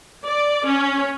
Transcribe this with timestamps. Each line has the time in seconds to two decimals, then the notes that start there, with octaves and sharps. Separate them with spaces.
0.25 D5
0.67 C#4